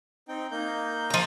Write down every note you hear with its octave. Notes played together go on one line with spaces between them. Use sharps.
C4 D#4 G5
A#3 D#4 G6
F3 A#5